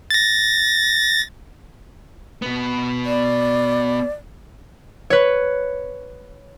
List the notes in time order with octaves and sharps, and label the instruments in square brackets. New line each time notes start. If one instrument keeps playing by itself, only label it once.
[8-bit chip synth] A6 A#6
[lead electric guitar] B2 B3
[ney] D5
[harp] B4 C#5